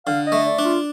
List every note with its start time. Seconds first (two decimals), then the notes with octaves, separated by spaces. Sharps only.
0.06 D3 F5
0.27 D#5
0.32 A3
0.46 D5
0.59 D4
0.65 F4